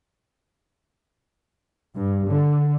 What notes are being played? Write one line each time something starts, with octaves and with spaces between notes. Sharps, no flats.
G2
D3